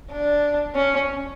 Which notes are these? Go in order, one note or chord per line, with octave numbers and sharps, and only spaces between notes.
D4
C#4